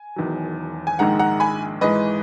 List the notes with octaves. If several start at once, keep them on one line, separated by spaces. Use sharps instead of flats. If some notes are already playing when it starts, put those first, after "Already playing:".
Already playing: G#5
E1 E2 D#3 F#3
G#5
A#1 G#2 D#3 G#3 F#5 A#5
F#5 A#5
G#5 B5
G#1 G#2 E3 G#3 B4 D#5